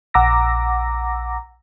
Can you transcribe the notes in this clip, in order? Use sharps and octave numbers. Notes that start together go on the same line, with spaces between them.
A#1 F#5 A#5 D6 E6 A#6